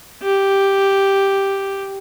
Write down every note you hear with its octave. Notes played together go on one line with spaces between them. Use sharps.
G4